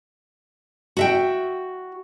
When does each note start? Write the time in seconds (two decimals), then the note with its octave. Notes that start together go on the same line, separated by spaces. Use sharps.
0.97 F#4 E5 G5